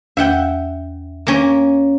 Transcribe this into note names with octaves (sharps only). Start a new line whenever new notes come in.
E2 E5 F#5 G5
A#3 C#4